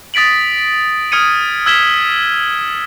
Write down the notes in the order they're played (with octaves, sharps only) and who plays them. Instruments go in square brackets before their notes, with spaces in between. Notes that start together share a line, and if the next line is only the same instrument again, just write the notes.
[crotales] D#6 A6 B6 D7 F#7
D#6 F6 G#6 C#7 D#7
E6 F6 G#6 B6 E7 G7